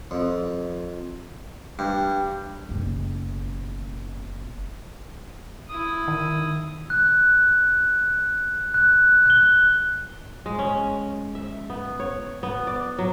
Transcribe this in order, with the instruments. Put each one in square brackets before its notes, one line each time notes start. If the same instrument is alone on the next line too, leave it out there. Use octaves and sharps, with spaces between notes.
[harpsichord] F2
G2
[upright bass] F#1 B2
[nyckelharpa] E4 D#6
[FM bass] D#3
[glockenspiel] F#6
F#6
F#6 G7
[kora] G#3
C#4
E5
B3
C#5
B3
D5
F#3